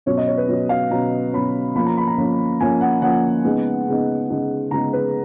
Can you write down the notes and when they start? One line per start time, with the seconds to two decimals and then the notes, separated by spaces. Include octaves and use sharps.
0.06 B2 F#3 C#4 C#5
0.17 D#5
0.27 C#5
0.38 B4
0.48 B2 F#3 C#4 C#5
0.69 F5
0.90 B2 F#3 C#4 A#5
1.33 B2 F#3 C#4 B5
1.76 F3 A#3 C#4 B5
1.86 A#5
1.97 B5
2.07 A#5
2.18 F3 A#3 C#4
2.60 F3 A#3 C#4 G#5
2.81 F#5
3.02 F3 A#3 C#4 F#5
3.45 C#3 G#3 B3 D#4
3.88 C#3 G#3 B3 D#4
4.30 C#3 G#3 B3 D#4
4.71 C#3 G#3 B3 D#4 A#5
4.93 B4